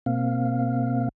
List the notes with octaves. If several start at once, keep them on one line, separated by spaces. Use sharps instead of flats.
B2 A#3 C4 F5